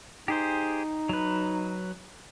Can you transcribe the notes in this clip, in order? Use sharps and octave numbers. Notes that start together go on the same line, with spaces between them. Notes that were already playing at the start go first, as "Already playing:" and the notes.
D#4 G4 G#4 C5
F#3 B4